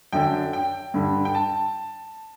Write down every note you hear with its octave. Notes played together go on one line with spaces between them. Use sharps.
F#2 D3 G5
G5
G2 D3
G5
A5